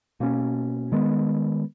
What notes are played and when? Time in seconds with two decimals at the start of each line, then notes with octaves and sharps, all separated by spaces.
0.20 B2 A#3 C#4
0.92 D#3 G#3 B3